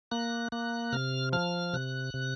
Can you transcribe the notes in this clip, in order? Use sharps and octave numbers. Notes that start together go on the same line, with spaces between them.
A#3 F#6
A#3 F#6
C3 F6
F3 F6
C3 F#6
C3